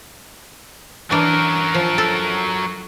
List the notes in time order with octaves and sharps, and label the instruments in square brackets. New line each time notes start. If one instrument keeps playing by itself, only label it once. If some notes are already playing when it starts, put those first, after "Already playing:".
[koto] E3 D4 [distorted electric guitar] F#3 A#4
[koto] F3
A4